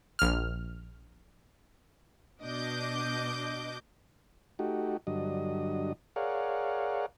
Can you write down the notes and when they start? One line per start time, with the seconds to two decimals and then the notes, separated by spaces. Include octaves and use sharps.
0.19 A#1 F6
2.41 B2 D4 D#5 D6 G6
4.59 A3 D#4 F#4 G4
5.07 G2 D3 F#3 D#5
6.16 G#4 A#4 C#5 D5 F5 F#5